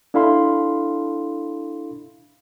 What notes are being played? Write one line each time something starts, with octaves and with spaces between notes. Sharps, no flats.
D4 E4 A4 F5 B5 C6